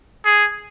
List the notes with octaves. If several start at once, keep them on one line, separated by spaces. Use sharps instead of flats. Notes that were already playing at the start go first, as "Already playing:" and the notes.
G#4